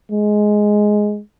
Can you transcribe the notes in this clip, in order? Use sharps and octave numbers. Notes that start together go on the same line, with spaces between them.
G#3